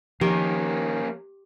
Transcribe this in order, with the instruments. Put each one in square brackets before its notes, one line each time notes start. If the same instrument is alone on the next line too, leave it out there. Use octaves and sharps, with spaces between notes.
[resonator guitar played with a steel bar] D#3 [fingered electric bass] F3 [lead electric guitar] A#3 C#4 [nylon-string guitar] G4